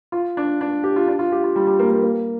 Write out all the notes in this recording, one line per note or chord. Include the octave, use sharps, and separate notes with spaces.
F4
D4
D4
G4
F4
D4
F4
G4
F4
G3
G3
A#3
A#3
A#3